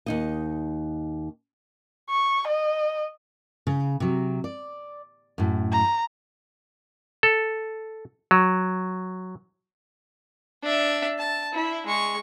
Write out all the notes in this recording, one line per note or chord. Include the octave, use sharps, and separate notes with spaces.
D#2 D#4 D#5
C#6
D#5
C#3
C3 F#3
D5
F#2 A2
A#5
A4
F#3
D4 E5
A5
E4
G#3 C#6